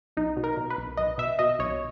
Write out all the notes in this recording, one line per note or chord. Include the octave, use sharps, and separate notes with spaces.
B1 D#4
B2
A#4
B2
B4
B1
B1 D#5
B2 E5
B2 D#5
B1 C#5